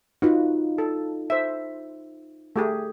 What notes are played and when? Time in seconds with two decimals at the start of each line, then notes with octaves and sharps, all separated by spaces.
0.22 D#4 F4 F#4 B4
0.78 A4
1.30 C5 E5
2.56 A3 G4 G#4